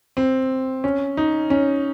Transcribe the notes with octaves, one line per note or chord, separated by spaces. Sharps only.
C4
C#4
D#4
C#4